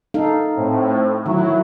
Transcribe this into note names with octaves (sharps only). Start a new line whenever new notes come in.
D#4 A4 F5
A2 C4
D#3 F#3 E4